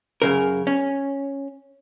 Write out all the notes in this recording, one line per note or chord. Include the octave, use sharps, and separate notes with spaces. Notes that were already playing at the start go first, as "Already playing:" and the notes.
F#2 C#3 A#4
C#4